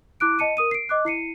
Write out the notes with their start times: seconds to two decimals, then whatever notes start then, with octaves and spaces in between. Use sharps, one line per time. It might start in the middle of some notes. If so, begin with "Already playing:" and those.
0.20 E4 D6 F#6 D7
0.39 D#5 A5 C#7 D#7
0.57 A#4 D#6 D#7
0.71 C7 D7
0.89 D#5 D6 F#6
1.05 E4 C7 C#7 D#7